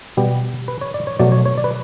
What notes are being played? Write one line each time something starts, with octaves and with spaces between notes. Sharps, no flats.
B2 G3 B3 G4
B4
C#5
D5
C#5
B2 F#3 A3 D5
C#5
C#5
D5
B4